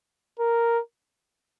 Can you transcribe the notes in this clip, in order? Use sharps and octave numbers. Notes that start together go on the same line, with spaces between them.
A#4